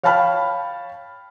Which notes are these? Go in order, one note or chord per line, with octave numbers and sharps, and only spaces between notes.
C#5 F5 G5 A5 B5 F6